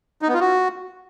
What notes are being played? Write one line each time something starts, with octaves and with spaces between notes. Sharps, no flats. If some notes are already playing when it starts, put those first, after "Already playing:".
D#4
B3
F4
F#4